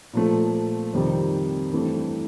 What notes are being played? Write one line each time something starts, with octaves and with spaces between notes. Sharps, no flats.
A#2 F3 A3
F2 C3 D#3 G3
G2 E3 A3 C4